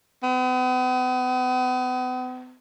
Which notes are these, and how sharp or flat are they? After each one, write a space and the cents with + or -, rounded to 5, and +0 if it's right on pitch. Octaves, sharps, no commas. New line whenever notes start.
B3 +40